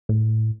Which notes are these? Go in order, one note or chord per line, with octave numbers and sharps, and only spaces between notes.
A2